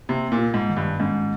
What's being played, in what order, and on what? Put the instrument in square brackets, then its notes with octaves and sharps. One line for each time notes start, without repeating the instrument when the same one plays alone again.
[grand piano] C3 [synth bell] A#3
[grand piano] A#2
[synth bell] F4
[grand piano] G#2
[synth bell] D#3
[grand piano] G2
[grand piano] G#2 [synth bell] C#4